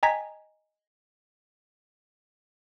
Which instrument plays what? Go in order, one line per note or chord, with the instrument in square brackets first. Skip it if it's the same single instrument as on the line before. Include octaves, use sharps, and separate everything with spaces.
[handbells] D#5 G5 G#5 A#5 G#6 B6